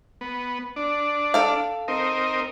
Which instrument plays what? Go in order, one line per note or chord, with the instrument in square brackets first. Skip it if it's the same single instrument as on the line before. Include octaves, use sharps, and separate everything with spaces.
[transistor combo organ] B3
D4
[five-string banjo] A4 F5
[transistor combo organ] C4 D#4 A#4